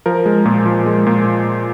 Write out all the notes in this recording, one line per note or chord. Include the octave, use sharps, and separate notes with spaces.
F3 A#4
G#3
A#2
F3
G#3
A#2